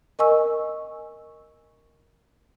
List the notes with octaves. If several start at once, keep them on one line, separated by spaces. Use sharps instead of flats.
A#4 D#5 G#5 C#6 E6